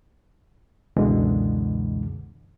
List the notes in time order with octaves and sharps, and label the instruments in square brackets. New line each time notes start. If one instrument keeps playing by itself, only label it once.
[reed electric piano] C#2 F#2 B2 D3 E3 G#3